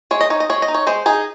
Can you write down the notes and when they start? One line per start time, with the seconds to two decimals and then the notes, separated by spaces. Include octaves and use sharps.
0.11 G#3 C#5
0.21 D#5
0.30 D#4 C#5
0.40 D#5
0.49 G#3 C#5
0.62 D#5
0.68 D#4
0.75 C#5
0.87 G#3 C5
1.06 D#4 G#4